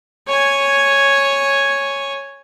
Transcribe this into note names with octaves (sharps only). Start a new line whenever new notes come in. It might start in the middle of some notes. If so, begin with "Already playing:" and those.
C#5 G#5